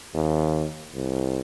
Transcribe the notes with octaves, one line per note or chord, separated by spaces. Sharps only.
D#2
C2